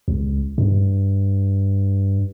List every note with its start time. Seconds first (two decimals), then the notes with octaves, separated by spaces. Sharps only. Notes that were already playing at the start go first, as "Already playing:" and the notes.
0.08 C#2
0.58 G2